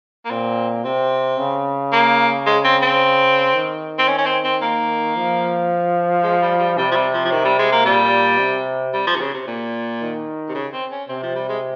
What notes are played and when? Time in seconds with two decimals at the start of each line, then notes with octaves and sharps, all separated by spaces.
0.25 A#3
0.30 A#2 C4
0.84 C3 C4
1.38 C#3
1.92 A#3
2.46 G#3
2.64 C4
2.82 C4
3.54 D#3
3.98 C4
4.08 C#4
4.18 C#4
4.26 C4
4.44 C4
4.62 A#3
5.16 F3
6.23 G#3
6.42 G3
6.59 G3
6.78 C3 G3
6.91 F3
6.96 G3
7.13 F3
7.24 F3
7.31 D#3
7.45 G3
7.59 G#3
7.72 A#3
7.85 A#2 G3
8.39 C3
8.93 G3
9.07 F3
9.15 C3
9.20 C#3
9.34 C3
9.47 A#2
10.01 D#3
10.49 C3
10.55 C#3
10.73 C4
10.91 C#4
11.09 C3 C4
11.23 F3
11.35 G3
11.49 G#3